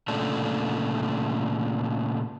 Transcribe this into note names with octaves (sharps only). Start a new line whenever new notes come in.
A#2 C#3 A3 D4